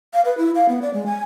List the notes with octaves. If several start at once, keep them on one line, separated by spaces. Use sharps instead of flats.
F5
B4
E4
F5
B3
D5
G#3
G#5